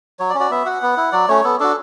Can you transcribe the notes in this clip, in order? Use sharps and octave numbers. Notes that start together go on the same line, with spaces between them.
F#3 C#5
D5
C#4
F#4 D5
B3 E5
F#4 F#5
B3
E4
F#3 D5
A3 C#4 C#5
B3 A4
D4 F#4 A4